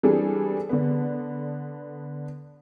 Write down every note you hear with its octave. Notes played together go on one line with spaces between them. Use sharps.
E3 G3 C4 D4 G#4 A4
D3 B3